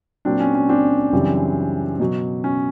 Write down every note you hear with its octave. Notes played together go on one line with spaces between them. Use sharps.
A#2 F#3 C4 D4
C#4
C#4
C4 D4
F#2 C#3 E3 G3
B2 F#3
C#4